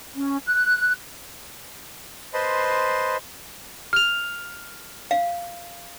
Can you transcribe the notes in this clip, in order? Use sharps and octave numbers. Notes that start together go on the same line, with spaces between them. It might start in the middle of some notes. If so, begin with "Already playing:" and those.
C#4
F#6
B4 C5 D#5 A5 B5 C6
F6 F7
F5